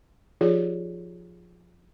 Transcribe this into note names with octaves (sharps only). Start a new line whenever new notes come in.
F3 D#4 F4 G4 G#4 C#5